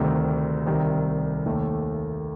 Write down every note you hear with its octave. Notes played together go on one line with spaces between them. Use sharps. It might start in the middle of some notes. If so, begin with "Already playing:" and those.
Already playing: D2 C3 D#3 G3
C2 C3 D#3 G3
D#2 D#3 A3